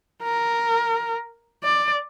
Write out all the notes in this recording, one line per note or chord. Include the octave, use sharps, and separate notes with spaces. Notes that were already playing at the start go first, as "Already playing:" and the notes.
A#4
D5